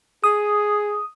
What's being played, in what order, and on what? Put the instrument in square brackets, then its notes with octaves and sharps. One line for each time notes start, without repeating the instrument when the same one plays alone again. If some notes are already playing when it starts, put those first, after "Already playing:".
[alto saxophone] G#4 [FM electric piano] D#6